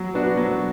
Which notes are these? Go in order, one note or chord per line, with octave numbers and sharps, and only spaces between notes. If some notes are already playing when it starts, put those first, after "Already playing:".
Already playing: F#3
B3 D4 F#4
F#3